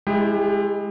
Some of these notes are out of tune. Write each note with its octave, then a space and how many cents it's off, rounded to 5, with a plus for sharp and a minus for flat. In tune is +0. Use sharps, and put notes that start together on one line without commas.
G#3 +0 E4 +0 G4 +30